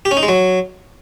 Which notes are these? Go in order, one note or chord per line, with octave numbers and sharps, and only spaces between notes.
G4
C#4
D#4
G#3
F#3